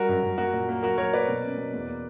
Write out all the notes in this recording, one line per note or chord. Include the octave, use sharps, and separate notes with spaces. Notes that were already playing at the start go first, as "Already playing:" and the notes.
Already playing: G3 F#4 A#4
F#2
F#2
A#3 F#4 A#4
A#2
A#3
F#3 F#4 A#4
F#3 A#4 C#5
A#3 B4 D5
B2
C#4
B2
E2
A#3